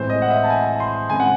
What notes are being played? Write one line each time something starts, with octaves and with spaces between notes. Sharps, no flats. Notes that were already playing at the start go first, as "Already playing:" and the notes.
Already playing: A2 E3 G#3 C4 C5
D#5
F#5
E5
A5
G#5
C6
C#3 G#3 C4 G#5
F#5